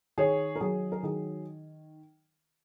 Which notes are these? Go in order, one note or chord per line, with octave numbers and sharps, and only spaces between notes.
D#3 G#4 C#5
A#4
F#3 G#4
A#4
D#3 G#4